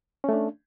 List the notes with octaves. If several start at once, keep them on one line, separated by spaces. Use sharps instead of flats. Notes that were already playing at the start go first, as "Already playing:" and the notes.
A3 C#4 D4